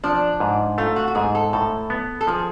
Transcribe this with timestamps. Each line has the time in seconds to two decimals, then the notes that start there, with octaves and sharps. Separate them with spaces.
0.04 F3 D4
0.40 G#2
0.78 A3 F4
0.96 F#4
1.08 F#4
1.15 G#2 G#4
1.35 A4
1.53 A2 A4
1.90 B3
2.21 A4
2.27 F3 G#4